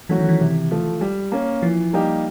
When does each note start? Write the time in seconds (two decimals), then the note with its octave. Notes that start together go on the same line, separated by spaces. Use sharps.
0.09 E3 F#3 A3 C#4 F#4
0.19 D#3
0.29 E3
0.40 C3
0.71 F3 A3
1.01 G3
1.32 A#3 C#4
1.62 E3 F3
1.93 G3 A#3 D#4 G4